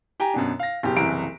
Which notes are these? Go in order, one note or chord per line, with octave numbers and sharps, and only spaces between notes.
G4 G5 G#5 A#5
F#2 B2 D4
F5 A#6
F#1 B2 G4
F#1 C2 E3 A#5 D7